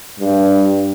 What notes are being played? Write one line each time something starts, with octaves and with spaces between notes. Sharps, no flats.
G2